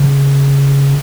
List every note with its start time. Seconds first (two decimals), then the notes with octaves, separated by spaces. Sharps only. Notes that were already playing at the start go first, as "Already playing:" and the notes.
Already playing: C#3